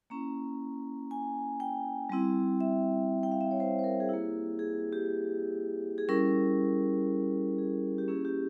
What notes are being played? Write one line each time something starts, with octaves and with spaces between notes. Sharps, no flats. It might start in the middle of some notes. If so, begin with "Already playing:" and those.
A#3 C#4 E4 A#5
G#5
G5
G3 C4 E4
E5
G5
F5
E5
C#5
C5
C5
A#4
G#4
A#3 E4 G4
G#4
G4
G#4
G3 C#4 E4 A#4
G#4
G4
A#3 C#4 E4 G#4
G4